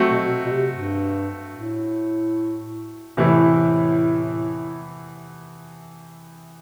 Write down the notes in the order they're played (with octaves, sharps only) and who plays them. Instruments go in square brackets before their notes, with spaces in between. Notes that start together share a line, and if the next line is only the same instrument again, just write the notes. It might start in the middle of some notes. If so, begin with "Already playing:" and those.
Already playing: [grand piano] F#3 A3 C4 F#4
[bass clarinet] B2
B2
C3
G2
A2
[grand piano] E2 C3 E3 A3 E4 [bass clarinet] A2